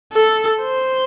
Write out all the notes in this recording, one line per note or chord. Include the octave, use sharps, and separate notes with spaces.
A4
C5